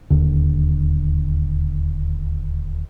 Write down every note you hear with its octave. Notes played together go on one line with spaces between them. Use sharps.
D1 D#2 D3